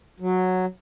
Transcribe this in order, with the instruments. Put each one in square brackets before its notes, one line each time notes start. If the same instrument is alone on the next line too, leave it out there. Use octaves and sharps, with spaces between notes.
[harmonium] F#3